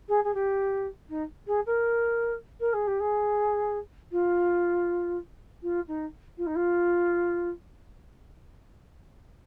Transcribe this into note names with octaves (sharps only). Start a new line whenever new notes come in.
G#4
G#4
G4
D#4
G#4
A#4
A#4
G#4
G4
G#4
F4
F4
D#4
F4
D#4
F4